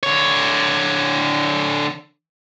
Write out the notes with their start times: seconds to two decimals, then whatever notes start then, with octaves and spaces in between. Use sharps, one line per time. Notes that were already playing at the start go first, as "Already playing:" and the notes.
0.03 D3 C#5